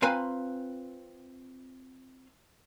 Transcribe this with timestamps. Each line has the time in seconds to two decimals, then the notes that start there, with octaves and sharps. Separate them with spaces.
0.02 C4 F4 B4 F5 G#5 A#5